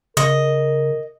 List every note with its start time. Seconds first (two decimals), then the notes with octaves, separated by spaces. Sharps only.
0.17 C#3 A#4 D#5